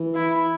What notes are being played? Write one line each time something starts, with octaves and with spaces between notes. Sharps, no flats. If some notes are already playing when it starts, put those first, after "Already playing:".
Already playing: E3
E4